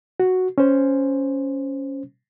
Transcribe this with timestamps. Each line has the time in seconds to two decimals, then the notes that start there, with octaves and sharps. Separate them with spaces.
0.20 F#4
0.58 C#4 C5